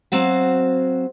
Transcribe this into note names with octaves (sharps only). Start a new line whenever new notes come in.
F#3 C4 F#4 F5